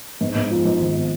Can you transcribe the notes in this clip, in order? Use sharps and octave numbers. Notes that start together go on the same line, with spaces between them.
G#2
G#2
F3
G#2
G#1